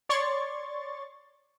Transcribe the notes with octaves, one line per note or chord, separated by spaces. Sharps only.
C#5 D5 C6 C#6 A6